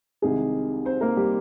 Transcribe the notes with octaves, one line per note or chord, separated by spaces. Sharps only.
C2 C3 D#3 G#3 G#4
C4 C5
A#3 A#4
G3 G4